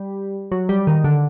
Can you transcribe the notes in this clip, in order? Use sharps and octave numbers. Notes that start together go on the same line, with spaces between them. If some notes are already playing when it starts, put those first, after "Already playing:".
Already playing: G3
F#3
G3
D#3
D3